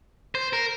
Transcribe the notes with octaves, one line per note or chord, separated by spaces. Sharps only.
C5
A#4